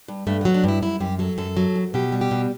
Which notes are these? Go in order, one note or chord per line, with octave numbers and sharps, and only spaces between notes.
G2
G2 A3
F#3 B3
D4
G2 E4
F#2 E4
F#2 G4
F#3 A4
F#2 A4
F#3
F#2
B2 G4
G3
G4
B2